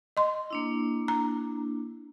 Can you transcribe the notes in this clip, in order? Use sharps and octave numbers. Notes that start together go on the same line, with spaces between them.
D#5 C6
A#3 D4 E4
A#5